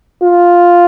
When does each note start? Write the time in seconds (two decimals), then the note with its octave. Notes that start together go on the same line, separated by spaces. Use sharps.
0.23 F4